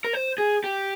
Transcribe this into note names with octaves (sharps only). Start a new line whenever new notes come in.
A#4
C5
G#4
G4